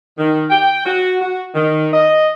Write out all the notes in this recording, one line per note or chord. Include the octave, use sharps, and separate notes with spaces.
D#3
G5
F#4
F#4
D#3
D#5